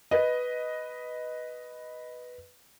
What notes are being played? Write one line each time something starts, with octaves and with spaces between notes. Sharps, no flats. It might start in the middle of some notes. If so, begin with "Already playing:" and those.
B4 D#5